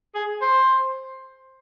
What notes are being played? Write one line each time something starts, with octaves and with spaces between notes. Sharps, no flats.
G#4
C5